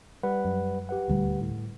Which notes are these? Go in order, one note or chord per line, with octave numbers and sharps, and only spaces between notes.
G3 B4 F#5
F#2
G4 B4 F#5
D#1 D2 G3
A2